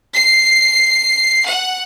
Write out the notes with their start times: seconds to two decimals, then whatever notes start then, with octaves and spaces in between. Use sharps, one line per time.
0.15 C7
1.47 F#5